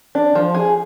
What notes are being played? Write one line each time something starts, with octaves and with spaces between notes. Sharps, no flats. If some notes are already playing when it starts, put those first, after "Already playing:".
D4
F3
G#4